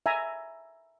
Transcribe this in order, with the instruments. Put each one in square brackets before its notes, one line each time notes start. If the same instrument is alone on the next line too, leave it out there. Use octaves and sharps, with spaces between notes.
[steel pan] E5 G#5 A#5